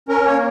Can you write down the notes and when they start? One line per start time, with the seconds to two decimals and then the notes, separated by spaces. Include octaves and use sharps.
0.09 C#4 A#4
0.25 A#3 C#5